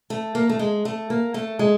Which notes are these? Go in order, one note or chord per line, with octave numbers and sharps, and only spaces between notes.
A3
A#3
A3
G#3
A3
A#3
A3
G#3